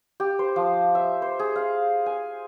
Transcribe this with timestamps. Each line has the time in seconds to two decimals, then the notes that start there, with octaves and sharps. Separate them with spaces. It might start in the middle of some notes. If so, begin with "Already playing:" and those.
0.20 G4
0.39 C5
0.56 F3
0.95 E5
1.22 C5
1.39 G#4
1.56 F5
2.06 G#5